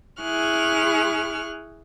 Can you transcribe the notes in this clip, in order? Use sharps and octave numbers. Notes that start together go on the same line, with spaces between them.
E4 G#4 C#6 F6 F#6